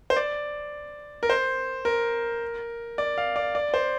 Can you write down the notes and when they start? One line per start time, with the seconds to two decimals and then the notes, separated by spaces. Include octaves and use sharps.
0.10 C5
0.16 D5
1.23 A#4
1.30 C5
1.85 A#4
2.98 D5
3.18 F5
3.36 D5
3.55 D5
3.74 C5